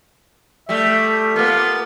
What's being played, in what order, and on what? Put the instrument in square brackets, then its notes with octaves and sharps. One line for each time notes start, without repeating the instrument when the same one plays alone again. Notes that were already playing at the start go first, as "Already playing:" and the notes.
[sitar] G3 A3 [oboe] E5
[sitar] A#3 B3 [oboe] F4